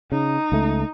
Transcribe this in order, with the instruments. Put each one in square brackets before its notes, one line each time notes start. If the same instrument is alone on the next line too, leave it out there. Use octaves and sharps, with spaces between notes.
[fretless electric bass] C#3 [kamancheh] D#4
[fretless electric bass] C#2 A3